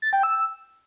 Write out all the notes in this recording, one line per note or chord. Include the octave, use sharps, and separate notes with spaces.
A6
G5
E6